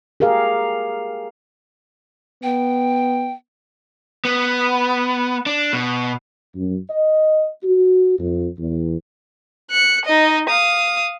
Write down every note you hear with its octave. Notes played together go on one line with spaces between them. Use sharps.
G4 G#4 A#4 F5
B3 G5
B3
D4
B2
F#2
D#5
F#4
F2
E2
F#6 C#7
D#4 D#5
F5 D#6